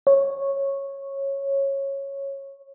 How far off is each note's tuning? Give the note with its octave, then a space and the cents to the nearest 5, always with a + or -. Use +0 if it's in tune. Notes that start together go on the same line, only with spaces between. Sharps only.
C#5 -10